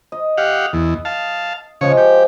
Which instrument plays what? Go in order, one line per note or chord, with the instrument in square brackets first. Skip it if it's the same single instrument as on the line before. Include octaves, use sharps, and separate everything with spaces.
[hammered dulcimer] D#5
[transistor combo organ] G4 F5 F#5
E2
F5 A5
[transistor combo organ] C#3 C#5 [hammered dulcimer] F3 G#3
[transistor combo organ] G4